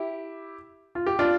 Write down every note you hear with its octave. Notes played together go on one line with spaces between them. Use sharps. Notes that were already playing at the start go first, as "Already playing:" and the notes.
Already playing: E4 G4
F4
G4
D4 F4